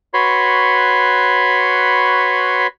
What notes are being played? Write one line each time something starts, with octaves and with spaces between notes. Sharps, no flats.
F#4 B4 C#5 B5 C6